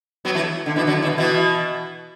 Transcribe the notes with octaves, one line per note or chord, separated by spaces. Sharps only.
F#3 B3
E3 A3
D3
B2 E3
D3 F#3
B2 E3
B2 E3